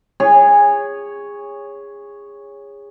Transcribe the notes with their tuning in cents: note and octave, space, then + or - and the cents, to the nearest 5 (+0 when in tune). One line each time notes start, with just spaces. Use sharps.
G#4 -25 C#5 +0